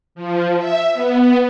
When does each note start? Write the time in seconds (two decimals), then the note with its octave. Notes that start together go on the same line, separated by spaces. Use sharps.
0.15 F3
0.58 E5
0.93 B3